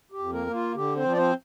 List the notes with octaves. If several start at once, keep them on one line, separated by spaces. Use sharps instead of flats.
G4
F2
A#3 A#4
A#3
F4
D3 G4
C4 C5
F3
D5
C4 C5